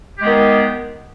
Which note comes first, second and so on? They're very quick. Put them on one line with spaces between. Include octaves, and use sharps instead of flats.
G4 G#3 B3 D#3